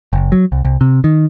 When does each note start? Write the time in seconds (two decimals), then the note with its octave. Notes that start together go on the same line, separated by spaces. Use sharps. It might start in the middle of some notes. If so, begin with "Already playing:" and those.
0.13 F#1
0.32 F#3
0.52 C2
0.65 C2
0.81 C3
1.04 D#3